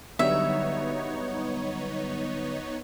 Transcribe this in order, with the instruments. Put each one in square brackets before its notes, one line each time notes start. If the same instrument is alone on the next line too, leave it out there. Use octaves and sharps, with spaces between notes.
[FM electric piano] D3 F#3 G3 [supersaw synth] B3 D#4 C#5 [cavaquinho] E5